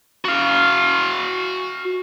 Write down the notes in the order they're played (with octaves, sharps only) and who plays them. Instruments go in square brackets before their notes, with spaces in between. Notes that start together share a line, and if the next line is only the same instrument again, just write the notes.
[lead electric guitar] F#4 F5